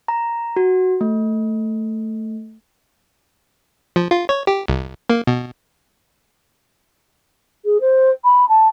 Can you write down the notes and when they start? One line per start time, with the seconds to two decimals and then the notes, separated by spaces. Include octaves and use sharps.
0.08 A#5
0.56 F#4
1.01 A3
3.96 F3
4.11 F4
4.29 C#5
4.47 G4
4.68 C2
5.10 A#3
5.27 B2
7.65 G#4
7.81 C5
8.24 B5
8.49 A5